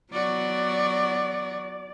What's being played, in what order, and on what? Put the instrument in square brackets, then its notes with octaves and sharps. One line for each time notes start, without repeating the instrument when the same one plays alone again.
[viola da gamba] F#3 B3 F#4 [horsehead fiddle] D5